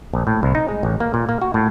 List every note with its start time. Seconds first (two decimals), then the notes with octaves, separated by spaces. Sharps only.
0.13 A#1
0.27 A2
0.43 C2
0.55 D#4
0.68 G#3
0.83 A1
1.00 A#3
1.14 A#2
1.29 A#3
1.42 F#4
1.54 A2